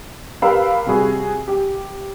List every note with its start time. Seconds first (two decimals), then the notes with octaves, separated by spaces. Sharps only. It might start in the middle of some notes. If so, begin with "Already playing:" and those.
0.42 G4 A#4 B4 F5 B5 E6
0.86 C3 G3 F#4 G#4
1.48 G4